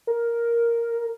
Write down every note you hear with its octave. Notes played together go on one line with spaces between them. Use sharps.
A#4